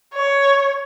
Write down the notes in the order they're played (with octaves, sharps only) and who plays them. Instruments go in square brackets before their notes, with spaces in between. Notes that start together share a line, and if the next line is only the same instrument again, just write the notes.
[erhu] C#5